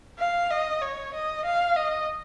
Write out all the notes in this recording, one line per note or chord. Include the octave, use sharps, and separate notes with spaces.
F5
D#5
C#5
D#5
F5
D#5